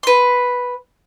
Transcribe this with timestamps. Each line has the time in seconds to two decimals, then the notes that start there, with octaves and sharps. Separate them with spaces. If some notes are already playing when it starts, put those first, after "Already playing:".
0.03 B4 C6